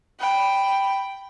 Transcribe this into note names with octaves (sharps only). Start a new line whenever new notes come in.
G5 B5